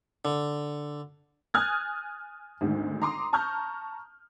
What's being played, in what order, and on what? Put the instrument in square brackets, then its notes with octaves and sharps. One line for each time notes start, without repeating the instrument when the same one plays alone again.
[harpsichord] D3
[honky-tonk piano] G#5 D#6 F6 F#6 G#6 A6
G#1 D2 G#2
A#5 C6 D6 D#6
A5 A#5 C#6 F6 G6